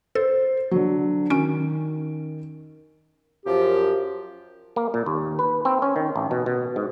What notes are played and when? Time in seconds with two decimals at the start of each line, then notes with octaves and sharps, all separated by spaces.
0.15 A4 C5
0.71 D3 F#3
1.30 D#3 C#4 D7
3.46 F#2 F3 G4
4.76 A#3
4.94 A#2
5.06 D#2
5.39 B4
5.65 C4
5.82 C#4
5.96 D#3
6.16 A1
6.31 B2
6.46 B2
6.76 G#2